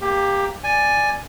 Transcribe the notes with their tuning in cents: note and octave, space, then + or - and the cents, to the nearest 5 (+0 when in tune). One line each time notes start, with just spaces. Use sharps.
A#3 +0 G4 +15
D5 +0 G#5 +0